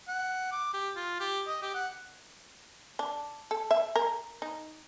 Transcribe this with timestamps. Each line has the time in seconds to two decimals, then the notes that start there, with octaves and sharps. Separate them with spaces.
0.08 F#5
0.52 D6
0.74 G4
0.96 F4
1.20 G4
1.47 D#5
1.62 G4
1.74 F#5
2.99 D4
3.51 A4
3.71 E5
3.96 A#4
4.42 D#4